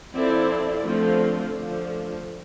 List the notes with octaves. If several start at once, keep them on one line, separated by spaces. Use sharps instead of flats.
F3 C4 E4 A4 D5
D3 F3 A3 C4 F4
D3 F3 A3